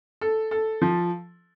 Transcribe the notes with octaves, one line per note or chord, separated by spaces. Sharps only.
A4
A4
F3